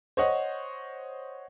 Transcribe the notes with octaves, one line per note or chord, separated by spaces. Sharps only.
C5 C#5 D#5 F#5